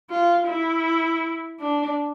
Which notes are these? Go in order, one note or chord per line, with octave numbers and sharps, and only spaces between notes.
F4
E4
D4